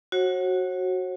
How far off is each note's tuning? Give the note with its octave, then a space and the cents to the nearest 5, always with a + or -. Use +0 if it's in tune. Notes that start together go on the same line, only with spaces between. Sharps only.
F#4 +0 C#5 -45 F#5 +0